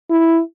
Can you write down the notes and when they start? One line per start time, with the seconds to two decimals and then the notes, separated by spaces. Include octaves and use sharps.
0.10 E4